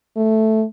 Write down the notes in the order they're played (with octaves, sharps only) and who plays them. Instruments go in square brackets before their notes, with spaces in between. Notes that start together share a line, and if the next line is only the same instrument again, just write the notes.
[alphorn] A3